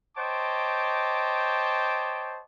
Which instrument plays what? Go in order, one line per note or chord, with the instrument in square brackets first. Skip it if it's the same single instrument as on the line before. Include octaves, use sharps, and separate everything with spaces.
[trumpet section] C5 C#5 D#5 G5 A5 D6